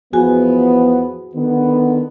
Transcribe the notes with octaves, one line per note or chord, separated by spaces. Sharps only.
E2 F3 B3 F#4 G#4 G#5
D3 D#3 B3